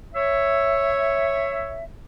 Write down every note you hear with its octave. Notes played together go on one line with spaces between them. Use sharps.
C#5 E5